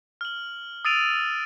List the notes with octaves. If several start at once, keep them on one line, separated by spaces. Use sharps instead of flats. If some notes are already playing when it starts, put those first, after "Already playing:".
F6 F#7
D#6 E6 A6 D7 D#7 F7